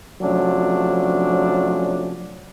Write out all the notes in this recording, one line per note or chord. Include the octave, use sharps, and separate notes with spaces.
C3 F3 F#3 A3 C#4 D4